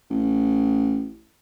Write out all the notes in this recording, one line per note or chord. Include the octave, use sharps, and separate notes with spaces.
A1